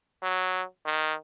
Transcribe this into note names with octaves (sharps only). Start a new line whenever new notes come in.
F#3
D#3